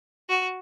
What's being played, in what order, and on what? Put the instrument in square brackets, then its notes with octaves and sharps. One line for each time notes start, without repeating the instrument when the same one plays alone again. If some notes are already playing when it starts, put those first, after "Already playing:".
[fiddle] F#4